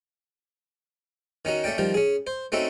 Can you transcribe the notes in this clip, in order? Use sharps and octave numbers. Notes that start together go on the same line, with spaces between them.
D#3 C#4 D#4 F#4
A3 C#4 D5 G5
D#3 F3 G3
C#4 G#4
C5
A3 C4 C#4 D#4 F#4 A4